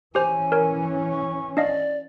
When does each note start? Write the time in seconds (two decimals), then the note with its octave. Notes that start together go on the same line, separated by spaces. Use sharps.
0.15 E3 C#4 G4 C5 G#5
0.52 A#4 C#5
1.12 C#6
1.57 D4 D5 D#5 F5